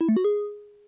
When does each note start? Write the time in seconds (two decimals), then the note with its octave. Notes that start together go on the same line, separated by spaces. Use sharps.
0.01 E4
0.09 A3
0.17 F#4
0.24 G#4